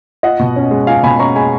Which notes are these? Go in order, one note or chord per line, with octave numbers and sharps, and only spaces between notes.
F4 D#5 F#5
B2
C#4
G#3
F4 F5 G#5
B2 G#5 B5
C#4 A#5 C#6
G#3 G#5 B5